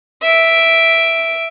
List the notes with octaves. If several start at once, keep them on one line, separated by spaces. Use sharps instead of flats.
E5 D7